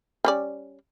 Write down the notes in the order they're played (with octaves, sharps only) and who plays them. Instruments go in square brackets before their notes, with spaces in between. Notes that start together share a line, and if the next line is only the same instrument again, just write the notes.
[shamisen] G3 C#4 D5